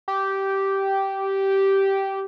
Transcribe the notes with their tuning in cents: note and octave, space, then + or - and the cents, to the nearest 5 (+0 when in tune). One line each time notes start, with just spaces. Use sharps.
G4 -10